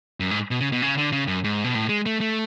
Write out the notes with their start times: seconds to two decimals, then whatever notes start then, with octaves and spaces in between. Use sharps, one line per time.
0.20 F#2
0.31 G#2
0.51 B2
0.61 C#3
0.72 B2
0.82 C#3
0.98 D3
1.12 C#3
1.28 F#2
1.44 G#2
1.64 B2
1.75 A2
1.89 G#3
2.06 A3
2.21 A3